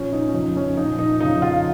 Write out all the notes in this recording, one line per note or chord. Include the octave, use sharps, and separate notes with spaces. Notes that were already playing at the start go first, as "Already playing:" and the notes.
Already playing: A#2 F3 C#4
D#4
C#4
F2 C#3 F3 D#4
C#4
A#2 F3 D#4
D#4
F2 C#3 F3 D#4
F4